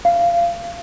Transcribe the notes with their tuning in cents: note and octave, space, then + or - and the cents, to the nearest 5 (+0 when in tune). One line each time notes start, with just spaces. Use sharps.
F5 -20